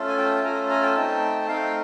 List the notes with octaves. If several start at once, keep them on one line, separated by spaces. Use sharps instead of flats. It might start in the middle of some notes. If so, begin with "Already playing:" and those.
Already playing: A3 C#4 F4 A4
G#5
G5 A5
A3 C#4 F4 A4 G#5 A#5
G#5 A#5
G5 A5
A3 C4 D#4
A3 C4 D#4 F5 G5